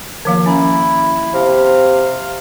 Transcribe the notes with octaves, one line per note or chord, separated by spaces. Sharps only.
D#3 F3 A#3
C#4 E4 A#5
C3 F5